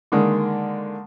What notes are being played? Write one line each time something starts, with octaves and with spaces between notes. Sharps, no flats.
D3 D#3 G#3 A#3